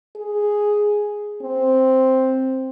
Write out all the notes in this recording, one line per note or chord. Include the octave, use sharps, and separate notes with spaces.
G#4
C4